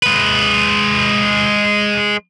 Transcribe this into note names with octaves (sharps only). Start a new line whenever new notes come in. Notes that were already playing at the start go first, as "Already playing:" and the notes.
G#3 B4